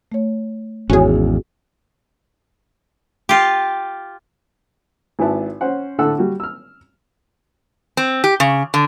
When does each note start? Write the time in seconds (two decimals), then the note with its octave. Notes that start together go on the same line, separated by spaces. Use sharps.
0.12 A3 C#5
0.90 G#1 E2 C#4 F#4 G#4
3.29 F4 G4
5.19 G#1 E4 B4 A5
5.61 C#4 C5 F#5
5.98 A2 D3 A4 F#5 E6
6.18 G3 F#4
6.40 E6 F6
7.97 C4
8.24 G4
8.40 C#3
8.74 D3